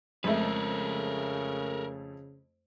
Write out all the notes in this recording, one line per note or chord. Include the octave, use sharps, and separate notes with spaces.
F2 C#3 G#3 A3 A#4 B4 E5